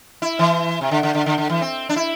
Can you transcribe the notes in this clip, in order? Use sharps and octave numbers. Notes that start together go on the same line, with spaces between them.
E4
E3
C3
D3
D3
D3
D3
D3
E3
C4
D4
E4